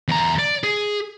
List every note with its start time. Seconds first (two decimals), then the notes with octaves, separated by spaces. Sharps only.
0.08 E2 A#5
0.39 D5
0.63 G#4